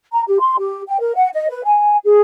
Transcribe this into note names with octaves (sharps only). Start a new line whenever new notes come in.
A#5
G4
C6
G4
G5
A#4
F#5
D#5
B4
G#5
G#4